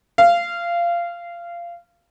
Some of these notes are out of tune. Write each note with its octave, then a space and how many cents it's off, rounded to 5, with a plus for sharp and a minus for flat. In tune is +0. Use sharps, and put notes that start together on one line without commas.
F5 -20